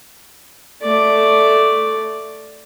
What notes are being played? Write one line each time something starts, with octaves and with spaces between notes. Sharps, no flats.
A3 D5